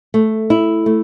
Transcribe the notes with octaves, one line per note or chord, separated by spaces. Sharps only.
A3
E4
A3